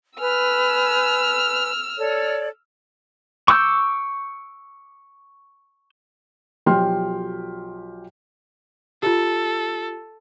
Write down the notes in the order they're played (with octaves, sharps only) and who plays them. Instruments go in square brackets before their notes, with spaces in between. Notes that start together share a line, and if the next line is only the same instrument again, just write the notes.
[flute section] B4 G#5 [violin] E6 F6
[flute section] A4 C#5 D5
[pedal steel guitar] C#6 D6 E6 F#6 G6
[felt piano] B1 F3 G4 G5 C6 F6
[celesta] F4 G4 [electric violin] A4